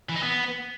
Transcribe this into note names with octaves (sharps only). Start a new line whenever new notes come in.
E3
D#4
B3